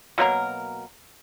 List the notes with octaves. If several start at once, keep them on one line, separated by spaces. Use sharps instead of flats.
B2 F#3 A#3 A#4